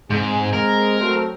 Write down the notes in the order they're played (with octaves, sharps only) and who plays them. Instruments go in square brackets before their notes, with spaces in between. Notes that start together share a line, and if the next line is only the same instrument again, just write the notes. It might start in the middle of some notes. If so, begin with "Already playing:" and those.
[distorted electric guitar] G#2 [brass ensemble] G#3 C4 G#4
[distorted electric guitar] A#4
[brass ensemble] F#3 A3 C4